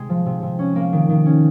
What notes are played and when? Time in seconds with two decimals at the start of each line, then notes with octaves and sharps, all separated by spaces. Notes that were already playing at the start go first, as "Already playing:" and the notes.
Already playing: C3 G#3
0.09 F3
0.26 C3
0.43 C3
0.59 C#4
0.76 A#3
0.92 D#3
1.09 D#3
1.26 C#4